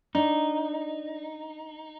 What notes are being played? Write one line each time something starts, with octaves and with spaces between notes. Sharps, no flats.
D4 D#4